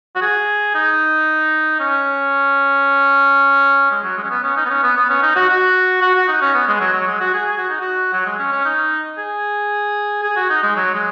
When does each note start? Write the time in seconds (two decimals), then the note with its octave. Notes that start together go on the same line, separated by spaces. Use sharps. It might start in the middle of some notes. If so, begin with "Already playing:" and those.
0.16 F#4
0.22 G#4
0.75 D#4
1.80 C#4
3.91 G#3
4.04 F#3
4.17 G#3
4.24 C#4
4.30 B3
4.43 C#4
4.57 D#4
4.65 B3
4.70 C#4
4.83 B3
4.96 B3
5.10 C#4
5.22 D#4
5.36 F#4
5.49 F#4
6.02 F#4
6.15 F#4
6.28 D#4
6.41 C#4
6.54 B3
6.68 G#3
6.81 F#3
6.94 F#3
7.07 G#3
7.20 F#4
7.34 G#4
7.47 G#4
7.57 F#4
7.69 D#4
7.81 F#4
8.13 F#3
8.26 G#3
8.39 C#4
8.52 C#4
8.65 D#4
9.18 G#4
10.23 G#4
10.36 F#4
10.50 D#4
10.63 G#3
10.76 F#3
10.94 G#3